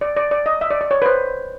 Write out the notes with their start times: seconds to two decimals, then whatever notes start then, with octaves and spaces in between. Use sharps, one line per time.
0.01 D5
0.17 D5
0.31 D5
0.46 D#5
0.61 E5
0.71 D5
0.81 D5
0.91 C#5
1.02 B4
1.06 C5